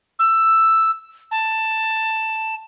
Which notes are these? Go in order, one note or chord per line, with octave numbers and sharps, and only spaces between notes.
E6
A5